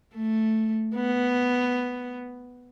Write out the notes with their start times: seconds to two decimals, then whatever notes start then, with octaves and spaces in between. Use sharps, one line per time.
0.14 A3
0.95 B3